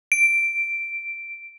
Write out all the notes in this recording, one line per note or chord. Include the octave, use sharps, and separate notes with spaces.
D7